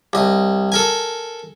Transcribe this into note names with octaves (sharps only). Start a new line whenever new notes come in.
C2 D#5
A4 A#4 G#5